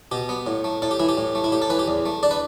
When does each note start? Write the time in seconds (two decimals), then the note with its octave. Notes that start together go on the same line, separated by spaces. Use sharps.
0.11 B2 G4
0.29 B3
0.47 A2
0.64 A3
0.82 A2 A4
0.91 G4
0.99 E3 E4
1.09 G4
1.18 A2
1.35 A3
1.44 E4
1.52 A2 G4
1.62 A4
1.70 E3 B4
1.79 G4
1.88 E2
2.06 A3
2.23 D4 D5
2.31 B4